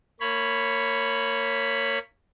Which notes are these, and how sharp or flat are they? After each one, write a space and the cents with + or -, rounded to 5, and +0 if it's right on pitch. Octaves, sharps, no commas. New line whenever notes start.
A#3 -25 C#5 +0 B5 +0